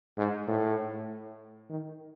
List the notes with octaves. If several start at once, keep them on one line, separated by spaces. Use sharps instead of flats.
G#2
A2
D#3